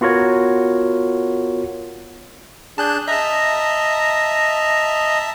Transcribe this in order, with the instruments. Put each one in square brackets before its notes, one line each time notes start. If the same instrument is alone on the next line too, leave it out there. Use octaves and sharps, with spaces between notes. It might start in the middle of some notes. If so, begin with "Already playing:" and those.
[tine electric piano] B3 F4 F#4 A#4 C#5
[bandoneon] D4 G#4 [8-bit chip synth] A5 F#6 G6
[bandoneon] D#5 A#5 [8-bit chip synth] E5 A5